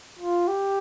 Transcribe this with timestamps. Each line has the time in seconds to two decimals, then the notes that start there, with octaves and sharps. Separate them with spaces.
0.19 F4
0.48 G4